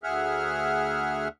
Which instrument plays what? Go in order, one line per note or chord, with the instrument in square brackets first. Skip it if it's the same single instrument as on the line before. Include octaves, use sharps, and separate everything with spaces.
[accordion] D2 G#4 E5 F#5 F6